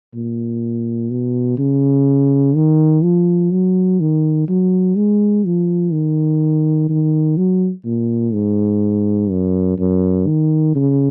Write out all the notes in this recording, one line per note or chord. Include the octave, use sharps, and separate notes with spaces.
A#2
B2
C#3
D#3
F3
F#3
D#3
F#3
G#3
F3
D#3
D#3
F#3
A#2
G#2
F#2
F#2
D#3
C#3